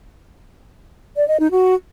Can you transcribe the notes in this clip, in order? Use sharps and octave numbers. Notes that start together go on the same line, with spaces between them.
D5
D#5
D#4
F#4